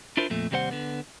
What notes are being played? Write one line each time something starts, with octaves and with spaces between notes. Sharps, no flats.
D4 E4 F4 A#4 C5
F2 A#2 A3
D#2 C3 G3 D#4 C5 F#5
D3 B3